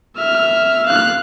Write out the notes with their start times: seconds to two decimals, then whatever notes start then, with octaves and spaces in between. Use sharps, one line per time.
0.16 E5 F6
0.86 F5 F#6